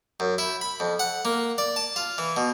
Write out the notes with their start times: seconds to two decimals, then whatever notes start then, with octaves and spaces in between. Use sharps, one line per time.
0.20 F#2
0.38 E4
0.61 B5
0.80 F2
0.99 F#5
1.25 A#3
1.58 D5
1.76 A5
1.96 F4
2.18 E3
2.37 B2